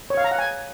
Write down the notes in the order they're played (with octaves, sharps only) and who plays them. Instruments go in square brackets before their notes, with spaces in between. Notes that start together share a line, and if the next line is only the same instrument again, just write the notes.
[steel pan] C#5
F5
A#5
F#5
G#5